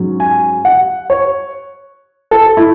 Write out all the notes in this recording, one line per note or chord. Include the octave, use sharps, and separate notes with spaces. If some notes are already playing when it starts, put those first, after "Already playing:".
Already playing: G#2 F#3 C#4
G#5
F#5
C#5
A4
E4